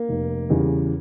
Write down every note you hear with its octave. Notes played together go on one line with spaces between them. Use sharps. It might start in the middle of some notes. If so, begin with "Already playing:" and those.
Already playing: A#3
F1
E2 C#3 G3